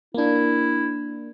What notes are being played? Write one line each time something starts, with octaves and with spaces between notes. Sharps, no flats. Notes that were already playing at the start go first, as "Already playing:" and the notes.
A#3 D4 E4